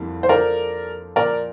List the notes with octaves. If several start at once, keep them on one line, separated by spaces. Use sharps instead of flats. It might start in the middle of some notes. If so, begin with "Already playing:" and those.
Already playing: F2 D3 G3 A#3 E4
C5
F3 A#3 D4 A4 A#4 D5
A#2 F3 A#3 A#4 D5